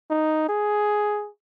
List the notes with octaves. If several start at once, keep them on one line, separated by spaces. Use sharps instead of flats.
D#4
G#4